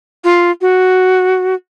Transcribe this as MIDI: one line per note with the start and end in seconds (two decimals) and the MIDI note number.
0.24 0.51 65
0.61 1.55 66